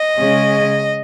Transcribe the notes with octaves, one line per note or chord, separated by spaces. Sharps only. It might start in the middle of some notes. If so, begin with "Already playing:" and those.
Already playing: D#5
C#3 G#3 C#4